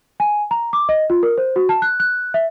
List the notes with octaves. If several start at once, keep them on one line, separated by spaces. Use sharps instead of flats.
G#5
A#5
D6
D#5
F4
A#4
C5
F#4
A5
F#6
F#6
E5